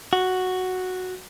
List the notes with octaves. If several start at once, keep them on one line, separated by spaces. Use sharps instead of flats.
F#4